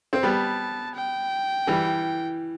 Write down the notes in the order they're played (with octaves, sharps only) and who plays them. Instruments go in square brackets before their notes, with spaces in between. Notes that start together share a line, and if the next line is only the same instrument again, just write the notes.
[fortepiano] C4
[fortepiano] G3 B3 [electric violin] A5
[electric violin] G5
[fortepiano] E3 G3